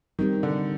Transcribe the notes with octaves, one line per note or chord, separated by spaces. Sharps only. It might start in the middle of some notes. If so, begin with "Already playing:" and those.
D#3 G3 C4 G4
D3